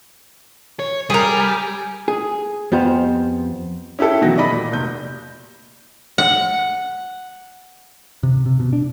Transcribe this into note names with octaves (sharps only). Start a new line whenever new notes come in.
C#5
G3 G#4 A#4
G#4
F2 B3 G4 C5 F5
C#4 E4 G4 A4
B2 D#3 E3 F#3 A#6
D5 D#5 B5
A#2
F1 G6
F#5
C3
C3
B2
D4